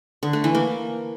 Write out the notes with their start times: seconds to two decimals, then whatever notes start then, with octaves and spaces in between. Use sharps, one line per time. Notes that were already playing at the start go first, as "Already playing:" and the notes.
0.23 D3
0.33 A3
0.44 E3
0.55 A#3